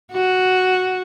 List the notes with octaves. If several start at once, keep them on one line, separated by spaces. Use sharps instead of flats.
F#4